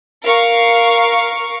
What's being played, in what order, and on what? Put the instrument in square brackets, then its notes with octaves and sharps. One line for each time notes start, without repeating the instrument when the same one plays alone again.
[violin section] A#4 F5 C#6